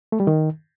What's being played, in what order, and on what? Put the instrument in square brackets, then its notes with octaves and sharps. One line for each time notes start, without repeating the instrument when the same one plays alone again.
[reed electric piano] A3
G3
D#3